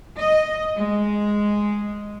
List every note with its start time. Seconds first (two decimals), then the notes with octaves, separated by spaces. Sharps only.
0.17 D#5
0.77 G#3